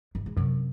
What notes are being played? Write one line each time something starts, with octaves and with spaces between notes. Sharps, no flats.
F#2
G#2
F#2 C3